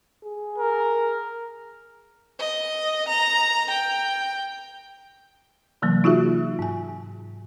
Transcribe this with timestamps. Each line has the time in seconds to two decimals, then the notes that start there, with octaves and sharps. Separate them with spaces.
0.23 G#4
0.58 A#4
2.39 D#5
3.08 A#5
3.70 G5
5.82 C3 E3 F#3 A#3
6.04 D#4 F4 F#4 G#4 E5
6.59 G#2 G#5